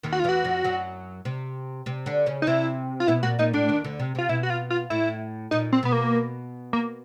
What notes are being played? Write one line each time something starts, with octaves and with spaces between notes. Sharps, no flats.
D#2 D#3
F#4
F4
E2 E3 F#4
F2 F3
F#2 F#3
C3 C4
C3 C4
D3 D4
C#3 C#4
D#4
C3 C4 E4
F4
B2 B3 E4
A#2 A#3 F#4
A#2 A#3 D#4
A2 A3 D4
D#2 D#3
D2 D3
C3
C3 F4
B2 E4
F#4
F4
F4
A2 E4
A#2 D#4
C4
B2 B3
A#3
A#3